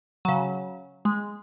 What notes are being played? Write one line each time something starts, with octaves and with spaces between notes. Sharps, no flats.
C#3 F#3
G#3